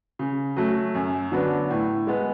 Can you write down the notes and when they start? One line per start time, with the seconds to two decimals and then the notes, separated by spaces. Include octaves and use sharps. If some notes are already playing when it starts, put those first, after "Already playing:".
0.19 C#3
0.57 F#3 A3
0.95 F#2
1.32 D3 F#3 B3 D4
1.70 A2
2.07 G#3 B3